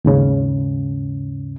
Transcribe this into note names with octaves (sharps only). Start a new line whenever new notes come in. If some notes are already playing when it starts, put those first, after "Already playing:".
D#2 G#2 C#3 C#4